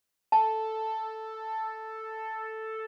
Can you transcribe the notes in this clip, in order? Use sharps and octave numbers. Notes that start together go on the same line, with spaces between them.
A4 A5